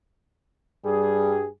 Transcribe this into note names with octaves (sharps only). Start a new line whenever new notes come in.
G2 G3 G#4